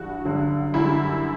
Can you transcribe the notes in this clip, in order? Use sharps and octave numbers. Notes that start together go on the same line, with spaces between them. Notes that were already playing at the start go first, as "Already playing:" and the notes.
Already playing: G2 E3 G3 F#4
G2 D3 F#3
F#2 D3 G3 E4